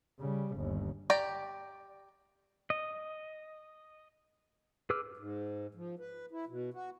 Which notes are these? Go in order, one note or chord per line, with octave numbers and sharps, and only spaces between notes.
C#3 G3
G1 D#2
G4 D5 G5 A#5
D#5
G#4 B4 D6 E6 F6
G#2
F3
B4
E4
B2
F#4